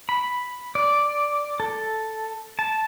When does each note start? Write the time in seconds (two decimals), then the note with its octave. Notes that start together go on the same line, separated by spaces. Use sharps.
0.09 B5
0.75 D5
1.60 A4
2.59 A5